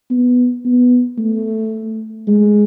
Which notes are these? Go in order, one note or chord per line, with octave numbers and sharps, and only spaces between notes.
B3
B3
A3
G#3